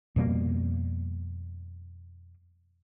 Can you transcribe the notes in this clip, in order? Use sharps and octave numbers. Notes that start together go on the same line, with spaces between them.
F2 B2 G3 A#3